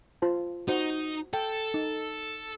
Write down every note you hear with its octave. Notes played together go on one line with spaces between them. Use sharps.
F4 C5 A5
D#4 F#4 C5
A4 G5
D#4